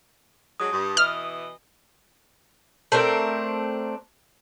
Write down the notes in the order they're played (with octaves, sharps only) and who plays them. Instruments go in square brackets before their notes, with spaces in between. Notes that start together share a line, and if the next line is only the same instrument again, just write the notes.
[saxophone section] F#3 G#3 D4 [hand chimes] D#6
[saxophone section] G2
[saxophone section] B2 E3 D#5 [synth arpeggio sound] F6
[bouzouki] A3 C4 D4 A#4